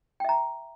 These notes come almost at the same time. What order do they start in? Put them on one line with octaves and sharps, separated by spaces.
G5 E5 A#5